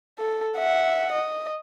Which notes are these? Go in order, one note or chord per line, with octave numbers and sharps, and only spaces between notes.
A4
E5 F#5
D#5